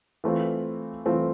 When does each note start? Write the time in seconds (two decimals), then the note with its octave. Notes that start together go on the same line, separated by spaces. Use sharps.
0.24 E3 A3 C4 F4
1.06 E3 A3 C4 F4